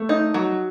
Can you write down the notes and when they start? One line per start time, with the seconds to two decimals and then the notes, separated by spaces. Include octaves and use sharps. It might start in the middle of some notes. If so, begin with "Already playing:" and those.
Already playing: A3
0.09 D#4
0.34 F#3